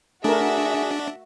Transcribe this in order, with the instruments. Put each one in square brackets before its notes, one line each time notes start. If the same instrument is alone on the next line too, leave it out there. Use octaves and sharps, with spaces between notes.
[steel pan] A3 A#4 [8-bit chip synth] D4 [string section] F#4 E5 [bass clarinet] G#4